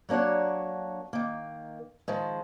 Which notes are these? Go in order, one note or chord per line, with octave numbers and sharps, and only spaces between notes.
F#3 A#3 D4 C#5 F#5
D#3 A#3
D#3 F3 G#3